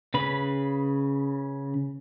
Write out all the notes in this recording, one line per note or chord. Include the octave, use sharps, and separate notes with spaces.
C#3 B4 B5